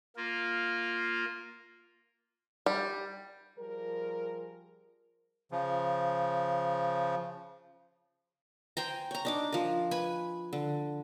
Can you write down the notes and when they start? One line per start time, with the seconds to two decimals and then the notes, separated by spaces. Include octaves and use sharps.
0.17 A#3 F4
2.66 G3
3.58 F3 G3 G#4 A#4
5.52 C#3 F3
8.77 C5 G5 G#5 A#5
9.11 C#5 A#5
9.25 D4 D#4 D6
9.52 F3 A#4
9.91 B4 G#5 B5
10.53 D3